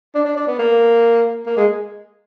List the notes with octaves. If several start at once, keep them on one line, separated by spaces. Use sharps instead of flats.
D4
D4
D4
B3
A#3
A#3
G#3